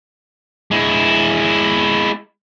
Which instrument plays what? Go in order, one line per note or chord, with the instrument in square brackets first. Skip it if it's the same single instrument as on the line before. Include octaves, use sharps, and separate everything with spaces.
[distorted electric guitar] G#3 E4